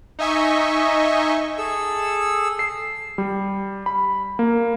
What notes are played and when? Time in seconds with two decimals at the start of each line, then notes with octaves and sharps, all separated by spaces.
0.19 D#4 D#5 E5 G#5 C#6
1.58 G#4 A4 E6
2.59 C7
3.18 G3
3.86 B5
4.39 A#3